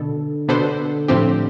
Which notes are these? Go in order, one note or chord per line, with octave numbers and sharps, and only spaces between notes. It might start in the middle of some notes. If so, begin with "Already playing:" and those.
Already playing: B2 D3 B3 A4
B2 B3 D4 A4 C5
A2 F3 C4 G4